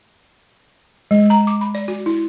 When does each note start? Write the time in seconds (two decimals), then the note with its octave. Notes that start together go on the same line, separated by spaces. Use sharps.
1.11 G#3
1.30 A#5
1.47 D6
1.61 B5
1.75 D5
1.88 F#4
2.06 E4